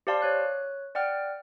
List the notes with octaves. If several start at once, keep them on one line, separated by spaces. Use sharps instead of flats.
G4 C5 D5 F5 A5 C6
C#5 F#6
D5 F#5 G5 F6